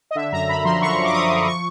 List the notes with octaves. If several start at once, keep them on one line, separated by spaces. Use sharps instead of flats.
D#5
D3 E5
F#2 A#5
F#2 B5
F3 C6
D3 C#6
F#2
D6
F#2 D#6
F3
F3 C#6